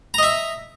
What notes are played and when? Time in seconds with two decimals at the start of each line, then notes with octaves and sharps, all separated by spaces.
0.14 A#5
0.18 D#5
0.23 E5